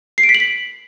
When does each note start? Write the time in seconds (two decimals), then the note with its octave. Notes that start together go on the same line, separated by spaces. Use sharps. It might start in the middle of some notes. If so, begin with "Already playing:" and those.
0.18 C7
0.23 D7
0.29 B6
0.35 F#7
0.40 B6